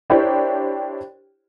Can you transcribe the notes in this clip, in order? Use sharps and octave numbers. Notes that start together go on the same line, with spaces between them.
D4 E4 G4 A#4 C5 C#5